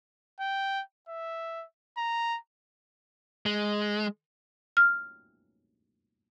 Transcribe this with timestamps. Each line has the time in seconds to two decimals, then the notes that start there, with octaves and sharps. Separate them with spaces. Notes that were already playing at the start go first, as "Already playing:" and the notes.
0.40 G5
1.09 E5
1.97 A#5
3.46 G#3
4.77 F6